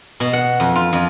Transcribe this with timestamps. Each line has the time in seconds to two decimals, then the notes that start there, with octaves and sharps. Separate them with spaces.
0.20 B2
0.33 F#5
0.60 F2
0.76 F4
0.93 F2